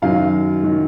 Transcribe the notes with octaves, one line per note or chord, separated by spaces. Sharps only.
F#2 D#3 F#3 F5
D#3 F#3